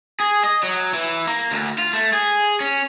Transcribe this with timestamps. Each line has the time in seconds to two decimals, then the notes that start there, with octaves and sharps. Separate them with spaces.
0.20 G#4
0.43 D#5
0.63 F#3
0.94 E3
1.27 A#3
1.51 D2
1.78 F4
1.93 A3
2.13 G#4
2.60 C#4